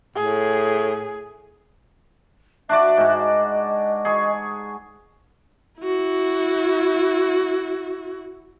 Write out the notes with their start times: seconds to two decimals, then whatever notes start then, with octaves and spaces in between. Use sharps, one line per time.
0.16 A2 G#4
2.69 D4 F#4 D5 E5
2.97 G#2 F#4
3.17 D#5
4.05 G#4 C#6
5.81 E4 F#4